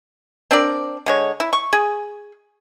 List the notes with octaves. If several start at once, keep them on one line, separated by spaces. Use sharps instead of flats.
C4 D4 A#4 D5
D3 G#3 C#5
E4
C#6
G#4